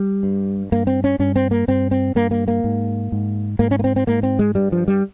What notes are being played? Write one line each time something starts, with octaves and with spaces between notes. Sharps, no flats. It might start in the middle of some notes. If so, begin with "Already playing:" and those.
Already playing: G3
G2
G2 A#3
C4
C#4
G2 C#4
C4
A#3
G2 C4
C4
G2 A#3
A#3
A#3
G#2
G#2
G#2 A#3
C#4
A#3
C4
C4
G#2 A#3
C4
G#3
G2 G3
F3
G3